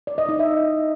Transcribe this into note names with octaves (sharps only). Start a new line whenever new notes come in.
D5
D#5
D#4
E5